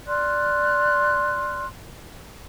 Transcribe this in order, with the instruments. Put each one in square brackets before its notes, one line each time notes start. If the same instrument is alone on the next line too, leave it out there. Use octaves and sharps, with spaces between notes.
[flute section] D5 C6 F6 F#6